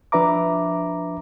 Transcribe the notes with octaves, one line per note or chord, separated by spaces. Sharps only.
F3 D4 B4 E5 A#5 D6